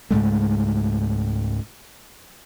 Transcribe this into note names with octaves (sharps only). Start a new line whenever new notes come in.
C#2 G#2 G#3 A3